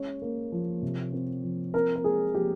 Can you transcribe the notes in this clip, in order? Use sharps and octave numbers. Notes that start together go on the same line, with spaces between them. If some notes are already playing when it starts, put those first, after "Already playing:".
Already playing: G#3 C#4 C#5
A#3
F3
C3
C4
F3
C4 A#4
A#4
G#3 G#4
F3 G4